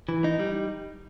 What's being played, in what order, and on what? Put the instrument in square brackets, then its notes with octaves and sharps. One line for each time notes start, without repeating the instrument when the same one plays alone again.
[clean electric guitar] E3
D#4
G3